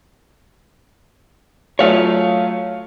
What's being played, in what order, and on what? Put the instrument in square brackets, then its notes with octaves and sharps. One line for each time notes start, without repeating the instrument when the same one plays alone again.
[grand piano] F#3 A3 F4 [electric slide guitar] C#5 F5